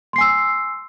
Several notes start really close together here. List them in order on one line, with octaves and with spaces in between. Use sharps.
C6 C7 G#5 E6